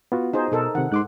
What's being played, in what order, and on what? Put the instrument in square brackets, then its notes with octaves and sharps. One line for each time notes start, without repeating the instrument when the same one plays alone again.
[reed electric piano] B3 F4 F#4
[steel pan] D#4 G#4 C5
[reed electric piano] B2 [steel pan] D#4 A4 A#4
[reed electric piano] C3 D#3 [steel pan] F#5
[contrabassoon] G#2 [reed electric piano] C6 D6 F#6